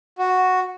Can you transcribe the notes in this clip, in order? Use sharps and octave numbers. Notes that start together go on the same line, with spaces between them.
F#4